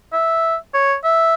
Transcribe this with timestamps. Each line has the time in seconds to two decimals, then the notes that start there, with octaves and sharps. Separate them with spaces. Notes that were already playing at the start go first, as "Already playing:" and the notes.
0.13 E5
0.74 C#5
1.04 E5